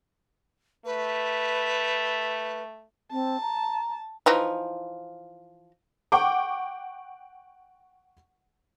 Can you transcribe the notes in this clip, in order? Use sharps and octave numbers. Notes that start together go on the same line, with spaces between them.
A3 B4
C4 A5
A#5
E3 F3 D#4
F#5 G5 C#6 D6